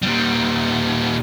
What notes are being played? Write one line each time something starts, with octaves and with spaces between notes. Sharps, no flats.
A#2 G3